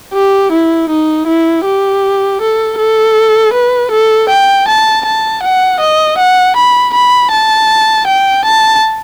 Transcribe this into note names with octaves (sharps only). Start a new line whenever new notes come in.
G4
E4
D#4
E4
G4
A4
A4
B4
A4
G5
A5
A5
F#5
D#5
F#5
B5
B5
A5
G5
A5